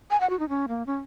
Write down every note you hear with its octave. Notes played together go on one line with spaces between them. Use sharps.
G#5
F#5
F#4
D#4
C#4
A#3
C#4